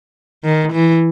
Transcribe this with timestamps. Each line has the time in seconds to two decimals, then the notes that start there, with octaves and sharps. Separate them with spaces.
0.44 D#3
0.73 E3